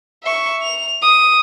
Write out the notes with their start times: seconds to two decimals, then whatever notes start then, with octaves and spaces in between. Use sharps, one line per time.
0.23 E5 C#6
0.62 F7
1.01 D#6